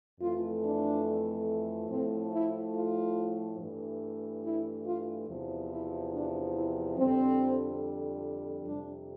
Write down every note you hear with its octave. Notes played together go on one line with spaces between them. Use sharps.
F2 E3 A3 F4
D4
A2 F3 A3 C4
E4
F4
G2 E3 A3
E4
F4
E2 C3 F3
E4
D4
E4
F2 D3 G3 C4
F2 C3 G3 D4